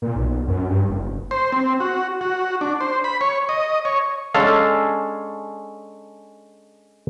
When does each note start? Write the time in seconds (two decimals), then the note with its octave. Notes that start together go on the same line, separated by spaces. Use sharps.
0.02 A#2
0.16 B1
0.48 F#2
0.70 G2
0.89 F#1
1.31 C5
1.52 C4
1.80 F#4
2.21 F#4
2.61 D4
2.80 C5
3.04 B5
3.21 C#5
3.49 D#5
3.85 C#5
4.34 G#3 C#4 D4 G#4 A4 F5